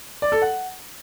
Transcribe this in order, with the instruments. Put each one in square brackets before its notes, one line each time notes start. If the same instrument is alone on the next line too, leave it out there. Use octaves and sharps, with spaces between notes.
[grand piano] D5
A4
F#5